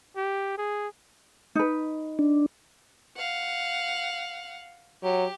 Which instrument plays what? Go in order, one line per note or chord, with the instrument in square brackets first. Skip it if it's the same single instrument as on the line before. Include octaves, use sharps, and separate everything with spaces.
[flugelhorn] G4
G#4
[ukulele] D#4 B4
[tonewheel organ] D4
[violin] F5 F#5
[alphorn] F#3 [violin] G4